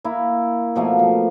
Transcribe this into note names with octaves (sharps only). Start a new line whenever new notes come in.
A#3 E4
B2 F3 A3 A#3
F3